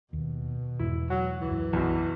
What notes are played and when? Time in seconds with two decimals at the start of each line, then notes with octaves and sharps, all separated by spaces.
0.13 D#2 B2
0.79 E2 G#2 E4
1.10 F#3 F#4
1.41 C#2 F#2 E3
1.73 B1 E2 B2